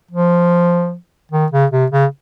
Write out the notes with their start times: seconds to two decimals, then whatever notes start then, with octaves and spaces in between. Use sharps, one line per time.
0.11 F3
1.32 D#3
1.52 C#3
1.72 C3
1.91 C#3